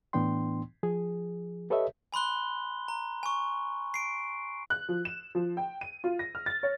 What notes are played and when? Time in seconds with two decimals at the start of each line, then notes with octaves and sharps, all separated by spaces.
0.13 A2 E3 B3 D4 G5 C6
0.83 F3 G#4
1.70 G4 A4 B4 C#5 D#5 E5
2.12 G#5 B5 C6 F#6 G7
2.88 A#5
3.23 G#5 C#6
3.94 C7 D7
4.70 F#6
4.89 F3
5.05 E7
5.35 F3
5.57 G5
5.81 D#7
6.04 F4
6.19 A#6
6.35 F6
6.46 A6
6.63 C#5